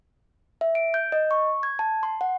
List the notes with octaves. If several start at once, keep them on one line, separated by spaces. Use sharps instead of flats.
E5
D7
G6
D#5
C#6
G#6
A5
C6
F#5